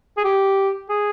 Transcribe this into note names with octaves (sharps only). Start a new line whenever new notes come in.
G#4
G4
G#4